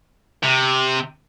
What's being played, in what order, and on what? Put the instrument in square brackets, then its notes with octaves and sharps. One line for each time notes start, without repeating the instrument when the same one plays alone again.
[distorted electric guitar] C3